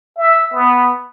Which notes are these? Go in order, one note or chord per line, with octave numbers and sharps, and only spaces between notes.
E5
B3